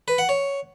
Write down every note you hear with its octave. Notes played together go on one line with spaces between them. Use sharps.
B4
F#5
C#5